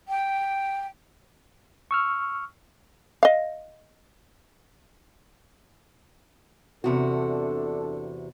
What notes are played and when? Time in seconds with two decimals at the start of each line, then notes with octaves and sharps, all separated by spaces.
0.08 G5
1.91 C#6 E6 F6
3.23 D#5 F5
6.84 E2 C3 D4 F#4 A4